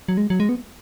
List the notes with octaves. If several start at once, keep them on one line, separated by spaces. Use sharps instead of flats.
F#3
G#3
F#3
G#3
B3